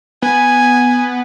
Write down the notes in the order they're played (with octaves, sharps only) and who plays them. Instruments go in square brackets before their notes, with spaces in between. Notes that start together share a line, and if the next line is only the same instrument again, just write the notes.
[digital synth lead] B3 [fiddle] G#5